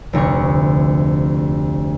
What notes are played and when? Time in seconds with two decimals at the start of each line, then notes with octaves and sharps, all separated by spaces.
0.13 F1 D2 F3 C#6